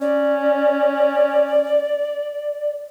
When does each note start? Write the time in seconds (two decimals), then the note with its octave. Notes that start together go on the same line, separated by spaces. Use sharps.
0.01 C#4 D5